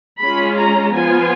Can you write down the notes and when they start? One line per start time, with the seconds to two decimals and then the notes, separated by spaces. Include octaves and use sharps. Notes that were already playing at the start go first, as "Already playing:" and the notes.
0.19 G#3 C#4 F4 B5
0.56 A#5
0.93 F3 B3 F4 G#5